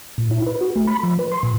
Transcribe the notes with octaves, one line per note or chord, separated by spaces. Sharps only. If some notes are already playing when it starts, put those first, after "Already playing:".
A#2
E4
B4
F#4
A3
B5
F3
B4
C6
A#2